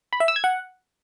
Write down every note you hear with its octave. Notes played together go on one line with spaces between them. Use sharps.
B5
E5
E6
G#6
F#5